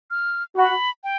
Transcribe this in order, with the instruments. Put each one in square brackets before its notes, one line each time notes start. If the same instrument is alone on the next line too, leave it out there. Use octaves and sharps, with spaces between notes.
[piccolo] F6
[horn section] F#4 [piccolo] B5
[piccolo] G5